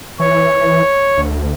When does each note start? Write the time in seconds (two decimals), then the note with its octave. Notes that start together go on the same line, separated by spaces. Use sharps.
0.19 E3 C#5
1.17 D2